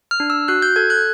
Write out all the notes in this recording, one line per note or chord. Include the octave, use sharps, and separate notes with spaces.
F6
D4
E6
F#4 F#6
G6
A4 G#6
F#6